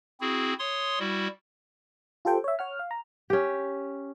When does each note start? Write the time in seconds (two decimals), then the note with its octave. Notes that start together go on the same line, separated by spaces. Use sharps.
0.21 C4 E4 F#4 G#4
0.59 C#5 C6 D#6
0.99 G3 E4 F#4
2.25 F4 G4 A4 C5 G5
2.44 C#5 E5
2.59 C#5 F#5 F6
2.79 F5
2.91 A#5
3.30 C#4 G4